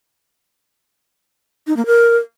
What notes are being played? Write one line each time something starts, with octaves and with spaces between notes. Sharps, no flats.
D#4
A#3
A#4